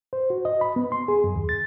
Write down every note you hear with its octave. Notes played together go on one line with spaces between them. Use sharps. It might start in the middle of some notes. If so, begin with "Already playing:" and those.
C5
F#4
D#5
B5
B3
C6
G#4
F#2
D#2
A6